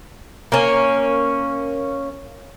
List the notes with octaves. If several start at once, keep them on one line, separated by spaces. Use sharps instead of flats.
A#3 C#4